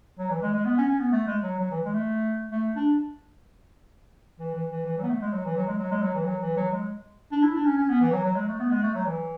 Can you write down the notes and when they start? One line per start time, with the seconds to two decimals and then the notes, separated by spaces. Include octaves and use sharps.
0.19 F#3
0.30 E3
0.42 G#3
0.54 G#3
0.65 B3
0.78 C#4
0.89 C#4
1.00 B3
1.12 A3
1.27 G#3
1.44 F#3
1.59 F#3
1.71 E3
1.86 G#3
1.94 A3
2.52 A3
2.76 D4
4.40 E3
4.55 E3
4.71 E3
4.86 E3
4.98 F#3
5.03 B3
5.09 A3
5.22 G#3
5.33 F#3
5.45 E3
5.57 F#3
5.67 G#3
5.79 F#3
5.91 G#3
6.03 F#3
6.15 E3
6.26 F#3
6.42 E3
6.57 F#3
6.72 G#3
7.32 D4
7.43 E4
7.55 D4
7.66 C#4
7.78 C#4
7.90 B3
8.01 E3
8.12 F#3
8.25 F#3
8.36 G#3
8.48 A3
8.60 B3
8.71 G#3
8.83 A3
8.95 F#3
9.06 E3